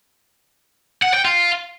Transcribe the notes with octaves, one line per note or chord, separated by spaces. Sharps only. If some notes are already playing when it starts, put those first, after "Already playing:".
F#5
G5
F4